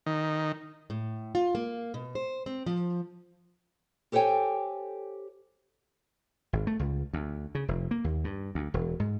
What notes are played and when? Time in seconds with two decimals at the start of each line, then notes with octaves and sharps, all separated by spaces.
0.06 D#3
0.90 A2
1.35 F4
1.55 A#3
1.94 B2
2.15 C5
2.46 C4
2.66 F3
4.12 G4 A4 C5 C#5 G5 G#5
6.53 G#1
6.67 A3
6.79 C#2
7.13 D2
7.55 C#3
7.68 F1
7.91 A#3
8.04 D#2
8.24 G2
8.55 D2
8.74 E1
9.00 G#2